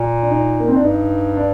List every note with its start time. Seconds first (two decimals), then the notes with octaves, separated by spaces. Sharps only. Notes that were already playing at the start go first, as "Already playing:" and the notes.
Already playing: A#2
0.22 D4
0.31 D#4
0.60 A#3
0.68 C4
0.76 D4
0.84 G2 D#4
1.37 D4